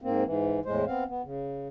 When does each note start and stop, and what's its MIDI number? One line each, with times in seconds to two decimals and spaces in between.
0.02 0.24 44
0.02 0.24 58
0.02 0.24 60
0.25 0.60 44
0.25 0.60 52
0.65 0.85 40
0.65 0.85 45
0.65 0.85 56
0.65 0.85 72
0.87 1.04 59
0.87 1.04 60
0.87 1.04 77
1.08 1.22 59
1.23 1.68 49